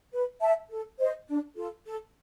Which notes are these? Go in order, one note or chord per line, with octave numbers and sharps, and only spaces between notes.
B4
E5 A5
A4
C5 D#5
D4
F4 A4
A4